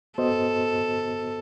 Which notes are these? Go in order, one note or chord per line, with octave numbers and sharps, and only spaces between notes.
B3 F#4 A4 C5 D#5